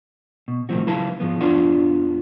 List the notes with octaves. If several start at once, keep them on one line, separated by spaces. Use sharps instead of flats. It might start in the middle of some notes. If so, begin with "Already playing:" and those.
B2
C2 A2 D#3 F3 C4 F#4
C#2 F#3 E4 B4 F5 A5
G#2 F3 B3
F2 B3 D4 F4 D5 F#5